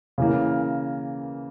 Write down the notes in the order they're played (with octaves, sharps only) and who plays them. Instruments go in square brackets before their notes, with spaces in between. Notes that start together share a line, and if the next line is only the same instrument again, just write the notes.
[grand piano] C#3 E3 A#3